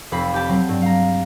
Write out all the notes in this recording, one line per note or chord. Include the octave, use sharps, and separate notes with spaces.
F1 F2 B5 C7
G4 G5 A5
F#3 C4
G2
F5 A#5